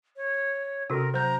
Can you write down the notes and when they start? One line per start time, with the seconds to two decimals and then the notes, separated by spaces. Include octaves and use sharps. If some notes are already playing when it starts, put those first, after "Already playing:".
0.17 C#5
0.90 C3 C#4 F#4 A4 A#4
1.14 F#3 C5 A#5 G6